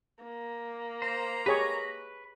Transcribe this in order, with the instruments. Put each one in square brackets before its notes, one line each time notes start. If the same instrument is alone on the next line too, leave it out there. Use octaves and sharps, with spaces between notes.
[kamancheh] A#3
[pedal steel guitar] C5 [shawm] A#5
[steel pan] G4 G#4 C#5 [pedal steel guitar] B4 C#6